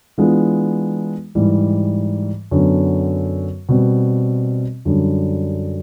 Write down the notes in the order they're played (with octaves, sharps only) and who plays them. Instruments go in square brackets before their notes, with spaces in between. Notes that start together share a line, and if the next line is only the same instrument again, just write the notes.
[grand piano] E3 G#3 B3 D4 F4
G#2 E3 G3
F#2 D3 F#3 B3
B2 G3 C4
F#2 D3 G3